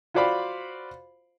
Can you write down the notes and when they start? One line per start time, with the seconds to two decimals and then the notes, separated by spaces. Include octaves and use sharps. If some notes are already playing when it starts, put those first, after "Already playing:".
0.14 F4 F#4 C5 D5 F5 B5